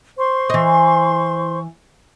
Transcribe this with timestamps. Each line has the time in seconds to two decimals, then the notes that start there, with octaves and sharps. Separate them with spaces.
0.18 C5 C6 C#6
0.50 E3 D#5